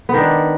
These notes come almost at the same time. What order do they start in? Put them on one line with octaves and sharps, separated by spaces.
B3 D#3 D4